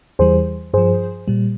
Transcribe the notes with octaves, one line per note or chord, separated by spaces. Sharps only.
E2 E3 G3 G#4 C5
G2 F3 G#4 C5
A#2 G3